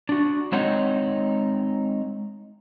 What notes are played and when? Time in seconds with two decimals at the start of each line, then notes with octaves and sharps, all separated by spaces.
0.09 D4 F#4
0.52 G#3 C4 D#4 C#5 F#5